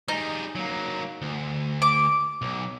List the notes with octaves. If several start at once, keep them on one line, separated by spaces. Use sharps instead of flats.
G3 D#4 G#4
F#3 A#3
D2
D6
B1